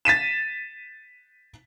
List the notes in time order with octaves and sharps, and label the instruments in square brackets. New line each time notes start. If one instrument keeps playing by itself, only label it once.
[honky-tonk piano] A6 B6 D#7 E7